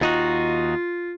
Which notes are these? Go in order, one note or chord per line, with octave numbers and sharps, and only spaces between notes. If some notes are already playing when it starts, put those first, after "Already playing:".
D#2 D#4 F4 F#4